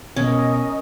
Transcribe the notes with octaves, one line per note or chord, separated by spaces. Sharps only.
B2 C#4 A#4 D#5